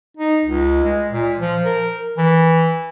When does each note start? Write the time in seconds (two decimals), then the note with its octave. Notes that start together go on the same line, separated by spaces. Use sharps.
0.17 D#4
0.45 C#2
0.85 G#3
1.11 A#2
1.40 F3
1.65 A#4
2.18 E3